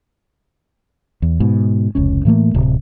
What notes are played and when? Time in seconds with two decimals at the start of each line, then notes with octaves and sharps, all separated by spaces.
1.22 E2
1.40 G#2 B2
1.95 F1 C#2 C#4
2.25 A2 E3 A3 A#3
2.55 D1 C3